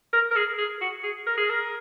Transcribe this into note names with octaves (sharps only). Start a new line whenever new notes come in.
A#4
A#4
G#4
G#4
F#4
G#4
A#4
G#4
A#4